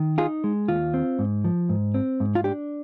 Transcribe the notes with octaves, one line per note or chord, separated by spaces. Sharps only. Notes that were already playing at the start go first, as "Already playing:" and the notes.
Already playing: D#3
D#4 F4 G#4
G#3
D#2 F4
C4
G#2
F3
G#2
C4
G#2
F4
D4 G4